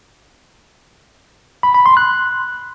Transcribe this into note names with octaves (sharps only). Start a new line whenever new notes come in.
B5
B5
C6
F#6